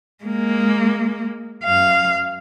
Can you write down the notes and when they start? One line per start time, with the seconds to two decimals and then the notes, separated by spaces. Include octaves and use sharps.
0.24 G#3 A#3
1.64 F#2 F5